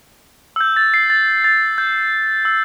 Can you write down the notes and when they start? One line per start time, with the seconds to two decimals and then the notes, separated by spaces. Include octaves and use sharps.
0.56 E6
0.61 G6
0.76 A6
0.94 C7
1.10 A6
1.44 A6
1.78 G6
2.45 E6